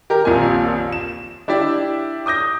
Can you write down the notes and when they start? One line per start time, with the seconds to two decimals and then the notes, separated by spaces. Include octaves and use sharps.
0.10 G4 A#4
0.25 D#1 A#1 F2 A#2 G#5
0.92 E7
1.48 D4 E4 G4 D5 E5
2.26 D6 D#6 G6 A#6